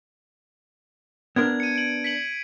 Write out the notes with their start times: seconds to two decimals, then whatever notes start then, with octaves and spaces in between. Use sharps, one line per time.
1.36 B3 D4 A#4 G#6
1.60 C#7 D#7
1.75 D7 F#7
2.04 B6 C#7 F#7